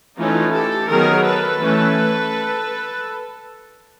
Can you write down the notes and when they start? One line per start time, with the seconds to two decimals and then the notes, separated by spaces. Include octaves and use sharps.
0.17 E3 A3 C#4 D#4 F4
0.52 G4 A4
0.88 D#3 F#3 B3 G#4 A#4
1.25 A4 B4
1.61 E3 A3 C#4